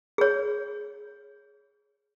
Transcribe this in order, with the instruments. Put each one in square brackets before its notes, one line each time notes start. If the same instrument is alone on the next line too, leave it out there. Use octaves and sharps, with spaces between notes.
[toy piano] G#4 C#5